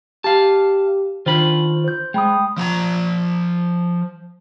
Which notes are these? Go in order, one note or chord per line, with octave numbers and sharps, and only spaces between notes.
G4 F5 A5
D#3 D4 F4 C5 B5
C5 G6
G#3 G5 B5 D#6
F3 F#5 A#5